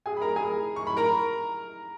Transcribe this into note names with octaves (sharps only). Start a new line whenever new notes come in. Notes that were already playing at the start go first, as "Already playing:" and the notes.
G#4 G#5
B5
A#4 A#5
G#4 G#5
C#6
B5
A#4 A#5